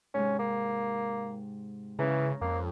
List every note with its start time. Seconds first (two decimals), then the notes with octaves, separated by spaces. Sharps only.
0.14 G#2 C3 G#3 C#4
0.39 A#3
1.99 C#3 E3 C#4 A#5
2.41 F2 A#3